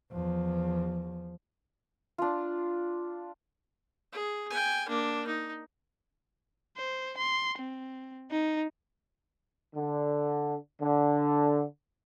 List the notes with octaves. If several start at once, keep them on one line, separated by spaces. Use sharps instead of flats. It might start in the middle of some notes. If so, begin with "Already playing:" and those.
E2 F3
D4 F4
G#4
G5 G#5
A#3 D4
D#4
C5
C6
C4
D#4
D3
D3